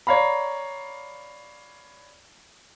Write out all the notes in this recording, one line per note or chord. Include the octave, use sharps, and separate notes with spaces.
C#5 D5 F5 A#5 B5